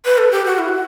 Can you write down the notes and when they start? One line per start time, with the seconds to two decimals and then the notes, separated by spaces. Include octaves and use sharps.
0.05 B4
0.18 A4
0.31 G4
0.45 F#4
0.59 E4
0.68 F#4